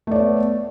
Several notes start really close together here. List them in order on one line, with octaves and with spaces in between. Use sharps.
A3 D5 C#5 B3